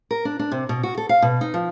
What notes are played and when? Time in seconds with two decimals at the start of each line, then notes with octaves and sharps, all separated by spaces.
0.11 A#4
0.25 D4
0.39 D4
0.51 C3
0.69 B2
0.83 F#4
0.98 A4
1.09 F5
1.22 B2
1.41 D#4
1.54 F3